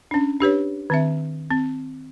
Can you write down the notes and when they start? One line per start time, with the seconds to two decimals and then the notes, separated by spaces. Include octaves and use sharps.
0.11 C#4 D4
0.40 D4 G4 B4 C#5
0.90 D#3 C4 E5
1.51 C4